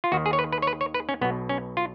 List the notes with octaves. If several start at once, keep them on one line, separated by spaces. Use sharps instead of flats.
F4
D#2 D#3 F#4
G#4
C#5
B4
B4
C#5
B4
C#5
B4
C#4
B1 B2 B3
C#4
F4